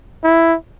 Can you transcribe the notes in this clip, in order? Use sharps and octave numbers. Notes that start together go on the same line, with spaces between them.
E4